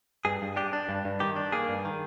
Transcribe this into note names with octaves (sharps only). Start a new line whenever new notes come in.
G2 G#4
G2
D4 G4
D4
G2
G2
D#3 G4
D4
A#3 G#4
G2
D#3